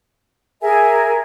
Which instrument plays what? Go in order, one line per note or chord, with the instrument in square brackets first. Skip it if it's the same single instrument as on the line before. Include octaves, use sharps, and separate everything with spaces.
[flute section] G#4 A#4 E5 G#5